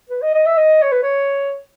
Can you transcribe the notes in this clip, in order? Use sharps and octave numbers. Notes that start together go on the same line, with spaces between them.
B4
D#5
D#5
E5
D#5
C#5
B4
C#5